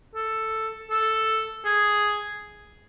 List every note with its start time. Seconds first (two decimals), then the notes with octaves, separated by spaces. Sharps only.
0.15 A4
0.91 A4
1.65 G#4